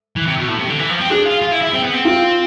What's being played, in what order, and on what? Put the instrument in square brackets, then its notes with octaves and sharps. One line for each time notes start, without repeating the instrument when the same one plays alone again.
[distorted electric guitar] E3
C3
B2
A2
C3
D3
E3
F3
C4
[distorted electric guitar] D4 [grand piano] G#4
[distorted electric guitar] F4
F4
E4
E4
C4
B3
C4
[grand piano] F4